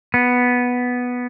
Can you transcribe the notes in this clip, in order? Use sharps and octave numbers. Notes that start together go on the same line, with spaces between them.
B3